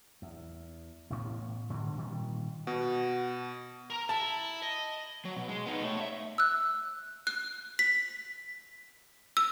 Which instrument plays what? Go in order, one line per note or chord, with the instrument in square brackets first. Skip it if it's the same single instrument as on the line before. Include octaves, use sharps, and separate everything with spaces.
[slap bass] E2
A1 A2 B3
G#2 D3
A#2 D#3 G3 C4
[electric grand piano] B2 [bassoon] F#4
[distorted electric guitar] A#4 A#5
[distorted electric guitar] E4 [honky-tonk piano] A5
[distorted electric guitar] D#5
[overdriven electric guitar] F#3
B2
G#3
B3 D#4
A3 C#5
C#5 E5
[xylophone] E6 F#6
F#6
B6
E6